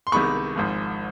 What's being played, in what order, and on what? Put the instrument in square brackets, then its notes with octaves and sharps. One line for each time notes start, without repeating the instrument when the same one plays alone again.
[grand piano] C6
C2 C3 D#3 G#3 B3 B5 C#6
G#1 G#2 F3